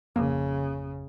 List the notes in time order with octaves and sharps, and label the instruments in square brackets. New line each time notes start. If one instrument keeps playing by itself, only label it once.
[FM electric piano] G#1 F2 [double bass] C#3 [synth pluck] A#3